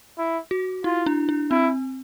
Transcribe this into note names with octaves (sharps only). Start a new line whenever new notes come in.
E4
F#4
E4 F4
D4
D4
C4 E4